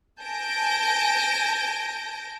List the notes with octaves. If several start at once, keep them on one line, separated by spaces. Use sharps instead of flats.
G#5 A5 G6 A#6 D7